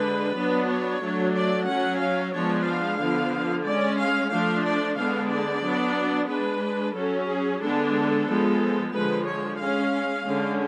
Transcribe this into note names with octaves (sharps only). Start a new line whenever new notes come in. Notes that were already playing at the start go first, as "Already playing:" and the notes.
Already playing: D3 G#3 D4 B4
F#3 B3 D4
C#5
F#3 A3 D4
D5
F#3 C#4 F#5
F5
F3 G#3 B3 D4 C#5
F5
D3 F3 B3
G#3 C#4 D5
F5
F3 A3 D4 F5
D5
D3 G#3 B3 D4 F5
D5
F#3 B3 D4
G#3 D4 B4
F#3 C#4 A4
G#4
D3 G#3 B3 D4 A4
A4
F3 G#3 B3
D3 F3 G#3 B4
C#5
G#3 C#4 F5
D3 G#3 C#4